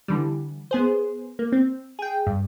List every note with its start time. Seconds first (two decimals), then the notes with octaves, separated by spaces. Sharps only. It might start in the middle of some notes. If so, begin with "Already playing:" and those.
0.08 D3 E3 G3
0.71 B3 G#4 C5
1.39 A#3
1.52 C4
1.99 G#4 G5
2.27 G2